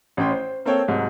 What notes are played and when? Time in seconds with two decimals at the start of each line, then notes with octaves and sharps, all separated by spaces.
0.17 A1 C#4 G5 C6
0.31 C5
0.66 A#3 C4 A4 C#5 G5
0.88 C2 G#2 F#3